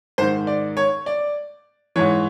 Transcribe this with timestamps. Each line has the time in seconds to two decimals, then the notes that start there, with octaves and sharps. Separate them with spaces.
0.18 G#2 D#3 C5
0.47 D5
0.77 C#5
1.06 D5
1.96 G#2 E3 C#5